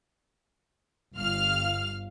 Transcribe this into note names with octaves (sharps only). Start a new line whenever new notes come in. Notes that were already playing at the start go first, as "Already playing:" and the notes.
G1 F5 F6